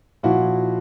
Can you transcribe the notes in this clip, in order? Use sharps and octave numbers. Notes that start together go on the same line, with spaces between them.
A#2 F3 E4 F#4